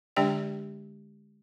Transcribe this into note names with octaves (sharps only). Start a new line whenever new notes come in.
D3 G#3 D4 G4 D5 G5